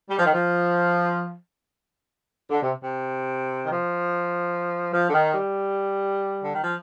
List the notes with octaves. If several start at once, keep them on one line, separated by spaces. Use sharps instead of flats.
G3
F3
D#3
F3
D3
C3
C3
D#3
F3
F3
D3
D#3
G3
D3
D#3
F3